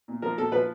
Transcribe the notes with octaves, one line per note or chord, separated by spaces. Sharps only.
A#2
F3 A#4
A#2 A4
F3 B4